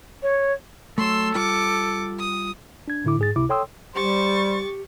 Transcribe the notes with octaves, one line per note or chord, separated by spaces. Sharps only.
C#5
F#3 A3 A4 C6 E6
G3 F4 D6 C#7
D#6
D4 G#6
A2 D3 E4 D6
G#2 G#4 A6
C#2 C3 E4 D6
A4 C#5 G5 C6 D#6 E6
G3 G4 C5 C#6 A6